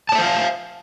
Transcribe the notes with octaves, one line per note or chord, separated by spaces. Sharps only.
C5 C#5 E5 F5 A5